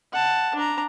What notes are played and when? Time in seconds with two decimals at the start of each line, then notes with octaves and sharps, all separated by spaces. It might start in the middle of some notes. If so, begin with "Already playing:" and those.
0.13 F#5 A5
0.55 D4 A#5